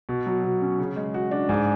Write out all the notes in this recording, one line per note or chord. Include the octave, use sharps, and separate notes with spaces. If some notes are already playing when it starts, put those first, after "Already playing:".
B2
F#3
B2
C#4
C#3
G#3
F#4
D4
G#2